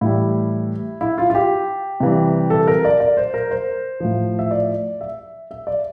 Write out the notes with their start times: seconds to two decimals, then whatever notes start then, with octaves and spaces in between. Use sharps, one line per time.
0.01 A2 E3 G3 E4
1.01 E4
1.18 F4
1.30 F4
1.35 G4
2.00 C3 E3 G3
2.50 A4
2.67 A#4
2.85 D5
3.00 D5
3.17 C5
3.34 A#4
3.51 C5
4.00 A2 F3
4.39 E5
4.51 D5
5.01 E5
5.51 E5
5.67 D5